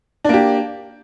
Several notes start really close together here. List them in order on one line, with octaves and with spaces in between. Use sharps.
D4 A#3 G4